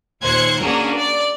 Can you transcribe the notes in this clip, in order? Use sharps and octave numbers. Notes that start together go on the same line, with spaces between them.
D#2 A#2 C5 F#6 G#6 C#7
A#3 C#4 D4 F#4 G#4 A#4
D5